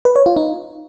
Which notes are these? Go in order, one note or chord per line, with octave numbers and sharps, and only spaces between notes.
B4
C#5
F4
D#4